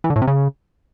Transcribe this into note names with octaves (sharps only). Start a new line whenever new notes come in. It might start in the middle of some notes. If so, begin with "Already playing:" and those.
E3
D3
A2
C3
C#3